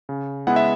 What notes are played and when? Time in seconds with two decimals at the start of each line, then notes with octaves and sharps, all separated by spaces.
0.09 C#3
0.47 G#3 B3 E4 F#5
0.56 E5